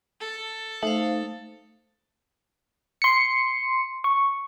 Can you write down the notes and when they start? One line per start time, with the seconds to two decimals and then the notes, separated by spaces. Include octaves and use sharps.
0.21 A4
0.82 A3 D#4 C5 F5
3.02 C6 C#7
4.04 C#6